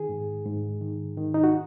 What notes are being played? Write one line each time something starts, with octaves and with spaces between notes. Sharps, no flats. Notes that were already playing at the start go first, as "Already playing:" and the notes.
Already playing: D#3 G#4
G#2
G#2
D#3
D#3
D#4
F#4